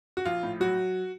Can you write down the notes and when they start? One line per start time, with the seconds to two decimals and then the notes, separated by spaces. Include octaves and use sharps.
0.17 F#4
0.25 A#1 F4
0.43 A2
0.60 F#3 F#4